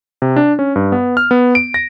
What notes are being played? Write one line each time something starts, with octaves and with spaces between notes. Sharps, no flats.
C3
D4
C#4
G2
B3
F6
B3
D7
A#6